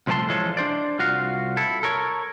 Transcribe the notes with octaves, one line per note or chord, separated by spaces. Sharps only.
C2 F3 A3 A#4 A5 C6
E3 F3 G#3 F4 A4 C#5
D4 C5 D5
C2 F4 F#4 F5
E4 A4
A4 A#4 C#5